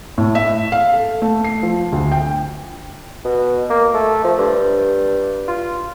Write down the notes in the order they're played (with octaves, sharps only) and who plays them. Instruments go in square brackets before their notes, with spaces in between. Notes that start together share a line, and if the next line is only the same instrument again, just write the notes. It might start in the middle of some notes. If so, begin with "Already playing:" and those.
[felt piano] A2
E5
F5
A4
A3
C7
F3
D2
G5
[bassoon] B2
A#3
A3
F3
G2
F4